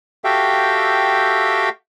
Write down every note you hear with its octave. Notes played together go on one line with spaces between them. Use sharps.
F#4 G4 A4 E5 F5 G5